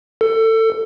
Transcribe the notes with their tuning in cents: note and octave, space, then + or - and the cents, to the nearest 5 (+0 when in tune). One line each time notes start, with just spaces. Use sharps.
A4 +25